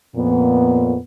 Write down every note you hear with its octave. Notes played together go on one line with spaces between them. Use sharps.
F2 A#2 B3